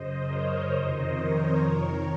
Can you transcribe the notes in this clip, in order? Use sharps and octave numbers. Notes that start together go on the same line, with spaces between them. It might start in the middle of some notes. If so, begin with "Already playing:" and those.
Already playing: F#2 C#3 C5 D#5
A#4 C#5
F2 C3 D#3 C5 D#5
A#4 C#5
F2 D#3